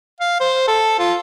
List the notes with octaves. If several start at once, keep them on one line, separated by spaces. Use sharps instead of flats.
F5
C5
A4
F4